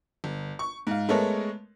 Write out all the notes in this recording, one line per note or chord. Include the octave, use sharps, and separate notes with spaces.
G1
C#6
G#2 F5
G#3 A3 B3 A4 A#4 C#5